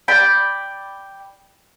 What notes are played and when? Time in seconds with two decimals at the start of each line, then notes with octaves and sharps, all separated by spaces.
0.08 D5 G5 B5